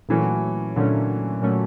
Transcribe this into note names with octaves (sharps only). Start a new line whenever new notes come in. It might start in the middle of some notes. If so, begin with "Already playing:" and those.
A#2 E3 F#3 A3 C#4
A#2 D3 F#3 A3 C#4
A#2 F#3 A3 C#4